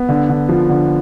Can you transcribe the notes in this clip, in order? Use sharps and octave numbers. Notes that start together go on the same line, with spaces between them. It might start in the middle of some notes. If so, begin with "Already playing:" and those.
Already playing: B3
D3
D3
F3
D3